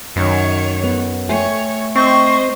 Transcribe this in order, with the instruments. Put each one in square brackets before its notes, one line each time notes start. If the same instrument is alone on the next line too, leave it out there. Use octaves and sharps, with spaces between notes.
[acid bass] F#2 [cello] D#3 C#5
[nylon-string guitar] B3
[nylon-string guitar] A3 G5 G#5 [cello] C#5
[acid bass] C4 [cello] C5 D#5 [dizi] C#6